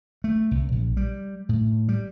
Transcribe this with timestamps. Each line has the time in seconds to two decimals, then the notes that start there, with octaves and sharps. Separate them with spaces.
0.24 A3
0.51 C2
0.72 A#1
0.97 G3
1.49 A2
1.89 G3